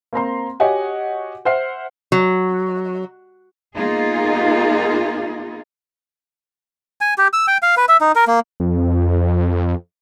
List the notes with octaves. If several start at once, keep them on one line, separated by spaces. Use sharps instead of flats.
A#3 C4 A#5 C6
F#4 G4 C#5 D#5 F#5 G#5
C5 E5 F#5 F6 C7
F#3
A#3 B3 D#4 F4 G#4
G#5
G4
E6
G5
F5
B4
E5
D#4
A#4
A#3
F2